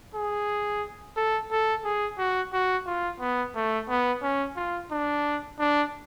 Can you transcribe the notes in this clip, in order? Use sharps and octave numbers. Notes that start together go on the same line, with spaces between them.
G#4
A4
A4
G#4
F#4
F#4
F4
B3
A3
B3
C#4
F4
D4
D4